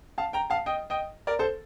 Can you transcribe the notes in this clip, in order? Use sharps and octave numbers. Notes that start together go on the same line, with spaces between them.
F5 A5
G5 A#5
F5 A5
D#5 G5
D#5 G5
A#4 D5
A4 C5